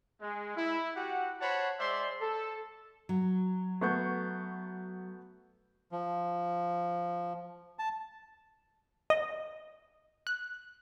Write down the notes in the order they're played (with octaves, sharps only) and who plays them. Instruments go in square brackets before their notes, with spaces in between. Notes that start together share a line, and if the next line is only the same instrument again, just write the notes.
[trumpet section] G#3
E4
F#4 G4 F#5
C5 C#5 F#5 A5 B5
G#3 C5 D5 E5 C6
A4
[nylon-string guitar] F#3
[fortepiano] A3 B3 C#6 [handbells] F#4 G6
[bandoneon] F3
A5
[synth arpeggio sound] D#5
F#6